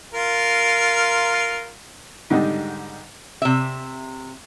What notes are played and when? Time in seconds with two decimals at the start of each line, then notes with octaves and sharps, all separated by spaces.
0.14 F4 A#4
2.30 G#2 D3 D#3 G3 D#4
3.42 C3 E5